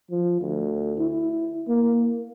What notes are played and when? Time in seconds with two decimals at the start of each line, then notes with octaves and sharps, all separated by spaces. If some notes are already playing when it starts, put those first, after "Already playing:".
0.11 F3
0.41 D2
0.99 E4
1.68 A#3